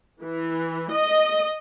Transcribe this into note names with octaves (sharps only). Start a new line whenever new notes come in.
E3
D#5